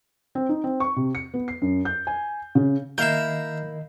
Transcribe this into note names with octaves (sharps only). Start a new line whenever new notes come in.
C4
D#4
C4
C#6
C3
C#7
B3
C7
F#2
G6
G#5
C#3
D#3 A#3 E4 A#4 D#5 E5 G6 C7